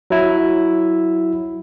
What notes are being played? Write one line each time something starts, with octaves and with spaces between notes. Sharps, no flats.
F#3 E4